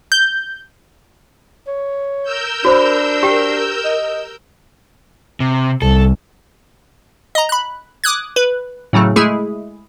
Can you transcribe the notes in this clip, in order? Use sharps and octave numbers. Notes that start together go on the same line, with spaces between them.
G6
C#5
A#4 E6 G6
D4 F#4 C5 B5
G4 G5
D#5
C3
C2 A4
D#5 A#5
B5 F#6
D6 D#6 F#6 G#6
B4
A2 C#3 F#3 A3
G#3 A3 E4 G#4